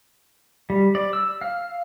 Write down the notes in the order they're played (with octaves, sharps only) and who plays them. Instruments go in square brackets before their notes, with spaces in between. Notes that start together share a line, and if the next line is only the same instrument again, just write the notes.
[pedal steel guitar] G3
D5
E6
F5